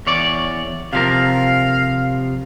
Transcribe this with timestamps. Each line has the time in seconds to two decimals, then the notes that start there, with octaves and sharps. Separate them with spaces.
0.07 E2 C#5 D5
0.93 C3 F3 A#4 F5